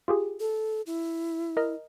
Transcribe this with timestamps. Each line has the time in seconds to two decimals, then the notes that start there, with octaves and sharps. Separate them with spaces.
0.08 F4 G4 G#4
0.40 A4
0.86 E4
1.57 A#4 D#5 F6